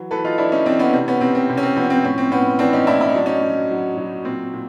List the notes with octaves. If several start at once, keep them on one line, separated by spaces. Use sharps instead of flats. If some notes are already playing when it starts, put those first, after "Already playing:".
Already playing: E3 F#3
E3 A4 B4
D#4 F4
E3 D4 E4
C#4 D#4
E3 C4 D4
B3 C#4
C3 C4
B3 C#4
C3 C4
C4
C3
C#4
C4
F3 B3
C#4
C4
A2 C#4
C4
A2 B3 C#4
E3 C4 D4
C#4 D#4
A2 D4 E4
E4
D#4
F#3 D4
C#4 D#4
F#3
F#3
F#3
A#2 C4
A#2